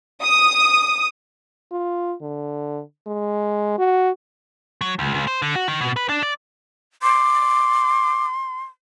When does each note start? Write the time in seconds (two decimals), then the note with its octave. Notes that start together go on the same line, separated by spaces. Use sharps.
0.23 D#6
1.72 F4
2.22 D3
3.07 G#3
3.78 F#4
4.81 F#3
4.99 C#2
5.14 C#2
5.28 C5
5.42 D3
5.56 F#4
5.68 D#3
5.81 B2
5.96 B4
6.09 D4
6.23 D5
7.03 C6 D6